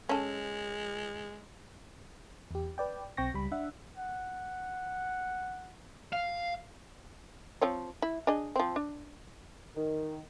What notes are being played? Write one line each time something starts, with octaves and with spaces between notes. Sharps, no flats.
G#3 C#4 A4
E2 G4
B4 D5 G5
B1 C4 G5 C#6 A#6
C#2 G3 B5
D4 E5 F#5
F#5
F5
F3 C4 C#5
E4
D4 G#4 D#5
F3 C4
D4
D#3